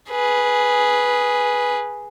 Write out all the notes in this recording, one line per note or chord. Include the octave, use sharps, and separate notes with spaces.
G#4 B4